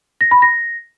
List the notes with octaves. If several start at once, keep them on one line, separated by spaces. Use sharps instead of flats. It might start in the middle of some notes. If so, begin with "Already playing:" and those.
A#6
B5
A#6